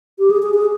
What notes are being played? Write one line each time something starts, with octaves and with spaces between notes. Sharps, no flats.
G4
G#4
G#4
G#4